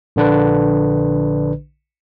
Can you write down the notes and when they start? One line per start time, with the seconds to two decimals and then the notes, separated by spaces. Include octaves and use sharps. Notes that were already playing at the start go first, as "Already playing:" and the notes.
0.16 A#1 D3 D4 B4